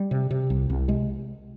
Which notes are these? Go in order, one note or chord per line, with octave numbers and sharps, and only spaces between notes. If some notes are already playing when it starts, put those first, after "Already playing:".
Already playing: G3
C3
C3
C2
C2
C3 G#3